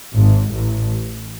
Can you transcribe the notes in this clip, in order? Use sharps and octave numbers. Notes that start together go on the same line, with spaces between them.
G#1 G#2
A1 A2